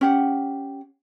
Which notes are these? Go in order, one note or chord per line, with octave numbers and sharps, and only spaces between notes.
C#4 G4 F#5